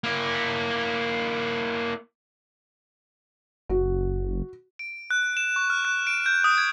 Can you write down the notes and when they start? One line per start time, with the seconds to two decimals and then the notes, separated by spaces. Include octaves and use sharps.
0.04 A#3 E4
3.69 F#1 F#4
4.79 D7
5.11 F#6
5.37 E7
5.56 C#6
5.70 F6
5.85 F#6
6.07 D7
6.26 G6
6.44 D#6
6.58 G#6